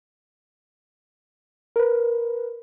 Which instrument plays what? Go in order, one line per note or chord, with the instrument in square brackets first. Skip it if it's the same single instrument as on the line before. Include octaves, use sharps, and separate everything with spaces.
[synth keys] A#4 B4